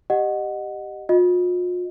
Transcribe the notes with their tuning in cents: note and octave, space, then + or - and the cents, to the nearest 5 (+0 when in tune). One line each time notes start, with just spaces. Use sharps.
G4 +0 D#5 -20 F#5 +0
F4 +45 D#5 +0